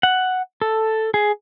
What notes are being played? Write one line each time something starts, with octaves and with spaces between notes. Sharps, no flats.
F#5
A4
G#4